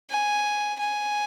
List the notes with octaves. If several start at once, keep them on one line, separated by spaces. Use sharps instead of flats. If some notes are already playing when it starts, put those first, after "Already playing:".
G#5
G#5